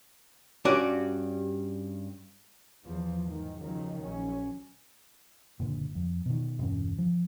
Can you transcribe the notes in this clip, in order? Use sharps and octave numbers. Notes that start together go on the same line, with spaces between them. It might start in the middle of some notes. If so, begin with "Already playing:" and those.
G2 C#4 F#4 G4 D5
E2 F3
G#2 D#3
C#2 D#3 F3 F#3
A#1 F#3 C#4
F#1 A#2 D3
F2
B2 D#3
E1 G2 C#4
F3